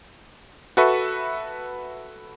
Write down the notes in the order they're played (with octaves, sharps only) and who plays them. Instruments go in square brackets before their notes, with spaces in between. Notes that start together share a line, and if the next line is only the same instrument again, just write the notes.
[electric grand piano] F#4 A4 B4 E5 C#6